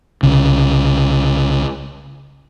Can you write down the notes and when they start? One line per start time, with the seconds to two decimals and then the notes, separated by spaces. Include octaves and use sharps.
0.23 C2 C#3